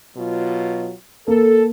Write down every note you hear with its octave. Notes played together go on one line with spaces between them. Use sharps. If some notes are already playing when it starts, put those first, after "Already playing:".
B2 F#3 F4
A#3 A4